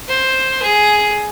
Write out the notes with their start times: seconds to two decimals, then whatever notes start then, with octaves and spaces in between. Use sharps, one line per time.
0.08 C5
0.63 G#4